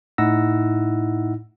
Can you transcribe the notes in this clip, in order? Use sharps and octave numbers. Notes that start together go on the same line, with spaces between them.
A2 D#4 E4 F#5 E6 A#6